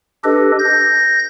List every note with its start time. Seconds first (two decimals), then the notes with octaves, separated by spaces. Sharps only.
0.24 D4 G4 A4 B4 D#5
0.59 G6 A#6